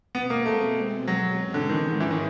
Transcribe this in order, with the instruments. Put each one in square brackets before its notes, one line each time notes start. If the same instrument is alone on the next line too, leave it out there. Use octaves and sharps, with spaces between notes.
[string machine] B2 G#3 C4 [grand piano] B3
[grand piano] A#3
A3
F#3
[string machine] G#2 E3 G#3 C#4
[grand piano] D3
D#3
E3
D#3